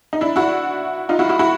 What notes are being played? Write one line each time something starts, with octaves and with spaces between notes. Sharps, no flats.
D#4
D4 E4
E4 F#4
D#4 F4
E4 F#4
E4 F#4
E4 F#4